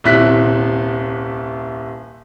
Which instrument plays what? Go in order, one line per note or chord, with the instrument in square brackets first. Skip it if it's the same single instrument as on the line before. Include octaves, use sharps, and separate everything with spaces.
[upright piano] D#1 C2 E4 F#6 B6